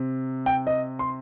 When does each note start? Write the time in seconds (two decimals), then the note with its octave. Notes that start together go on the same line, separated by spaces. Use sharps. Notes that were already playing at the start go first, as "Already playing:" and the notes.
Already playing: C3
0.46 G5
0.67 D#5
0.99 C6